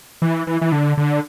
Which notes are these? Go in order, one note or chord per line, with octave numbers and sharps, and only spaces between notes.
E3
E3
E3
D3
D3